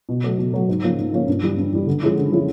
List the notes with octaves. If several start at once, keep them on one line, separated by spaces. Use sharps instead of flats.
B2
F#3 A3
B2
F#3 A3
G#2
F3 A#3 C#4
G#2
F3 A#3 C#4
G2
E3 G3
G2
E3 G3
D3
F3 G#3 C#4 E4
D3
F3 G#3 C#4 E4